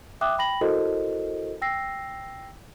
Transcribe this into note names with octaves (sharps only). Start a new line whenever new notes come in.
E5 G5 D6 D#6 F#6
G5 B5 A#6 F#7
E4 F#4 A4 A#4 C5 D#5
G5 E6 A#6 C7